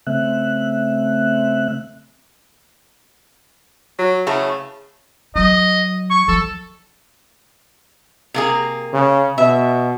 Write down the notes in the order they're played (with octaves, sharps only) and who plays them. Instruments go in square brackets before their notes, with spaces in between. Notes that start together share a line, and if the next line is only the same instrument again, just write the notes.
[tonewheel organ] C#3 A3 C4 E5 F#6
[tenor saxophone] F#3
[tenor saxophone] C#3 [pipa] E3 F#3 A3
[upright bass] F#3 [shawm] D#5
[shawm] C#6
[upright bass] F3 [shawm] A4
[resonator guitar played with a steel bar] C3 A#3 G#4
[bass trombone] C#3
[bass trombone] B2 [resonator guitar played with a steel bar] E5